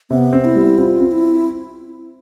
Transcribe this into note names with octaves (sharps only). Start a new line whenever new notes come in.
C3 B3
C4
E4
G3
C4 F4
C4
E4